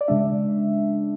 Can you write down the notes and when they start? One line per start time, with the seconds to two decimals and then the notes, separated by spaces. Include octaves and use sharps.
0.01 D5
0.08 C#3 G#3 D4 E5